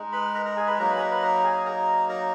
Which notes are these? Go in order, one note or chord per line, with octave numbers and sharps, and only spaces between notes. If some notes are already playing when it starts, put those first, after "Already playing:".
Already playing: G#3 D#4
B4 B5
A#4 A#5
A#4 A#5
G#4 G#5
B4 B5
F#3 A#3 D#4 A#4 A#5
B4 B5
G#5
A#4 A#5
B4 B5
A#4 A#5
G#4 G#5
A#4 A#5
A#4 A#5